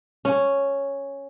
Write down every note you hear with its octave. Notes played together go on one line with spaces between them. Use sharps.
C#4